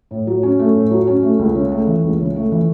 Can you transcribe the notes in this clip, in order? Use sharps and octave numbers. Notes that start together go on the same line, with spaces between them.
A2
F#3
C#4
A3
A2
F#3
C#4
A3
C#2
C#3
A3
E3
C#2
C#3
A3
E3